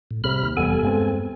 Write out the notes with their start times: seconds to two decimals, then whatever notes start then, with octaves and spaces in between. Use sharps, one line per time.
0.11 A2
0.24 C2 C3 B5 F6
0.43 D#2
0.57 F1 E2 G3 B3 A4 G#5
0.83 G2 G#3 C4